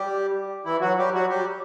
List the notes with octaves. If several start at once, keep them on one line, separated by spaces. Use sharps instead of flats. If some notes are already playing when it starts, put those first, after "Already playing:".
Already playing: G3 G4
E3 E4
F#3 F#4
G3 G4
F#3 F#4
G3 G4